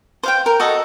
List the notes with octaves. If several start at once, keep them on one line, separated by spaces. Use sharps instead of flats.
C5 F5 G5
A#4
F#4 A4 D#5